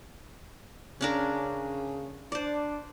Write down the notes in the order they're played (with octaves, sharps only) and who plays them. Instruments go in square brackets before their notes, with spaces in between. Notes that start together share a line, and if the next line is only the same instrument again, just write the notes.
[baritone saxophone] C#3 [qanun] C#4 D4 A#4
[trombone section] D4 [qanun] C5 D5